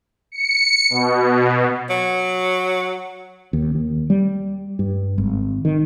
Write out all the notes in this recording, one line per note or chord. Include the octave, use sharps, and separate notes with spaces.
C#7
B2
F#3
D#2
D#2
G3
G2
G#1
D#3